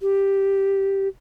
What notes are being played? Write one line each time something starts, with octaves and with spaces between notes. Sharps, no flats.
G4